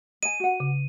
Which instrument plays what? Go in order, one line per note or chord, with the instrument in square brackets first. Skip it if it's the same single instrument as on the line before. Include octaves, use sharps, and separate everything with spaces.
[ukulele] D#5 G#5 [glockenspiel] D#7
[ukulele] F#4 F#5
[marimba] C#3